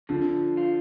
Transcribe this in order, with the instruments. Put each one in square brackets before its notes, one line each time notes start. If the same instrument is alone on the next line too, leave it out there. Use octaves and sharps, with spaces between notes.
[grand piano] D3 [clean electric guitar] F3
[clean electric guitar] F4